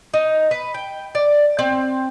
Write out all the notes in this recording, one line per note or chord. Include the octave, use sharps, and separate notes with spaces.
D#4
B4
G5
D5
C4